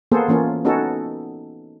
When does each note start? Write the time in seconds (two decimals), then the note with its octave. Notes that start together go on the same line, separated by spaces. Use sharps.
0.12 A#3 B3 G#4 A4 C5
0.28 E3 A#3 C#4 F4
0.65 B3 C#4 D#4 F#4 A4